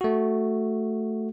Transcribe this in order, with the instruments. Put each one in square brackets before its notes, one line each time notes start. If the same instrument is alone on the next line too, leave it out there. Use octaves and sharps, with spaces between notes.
[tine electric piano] A3 F#4